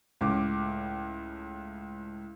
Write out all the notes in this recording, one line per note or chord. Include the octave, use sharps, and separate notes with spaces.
C#2 A2 D6